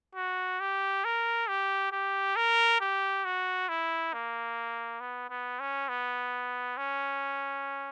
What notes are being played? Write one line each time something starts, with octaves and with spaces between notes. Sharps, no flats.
F#4
G4
A#4
G4
G4
A#4
G4
F#4
E4
A#3
B3
B3
C#4
B3
C#4